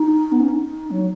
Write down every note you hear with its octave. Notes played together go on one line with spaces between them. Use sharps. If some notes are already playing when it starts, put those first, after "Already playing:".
Already playing: D#4
B3
C#4
D#4
F#3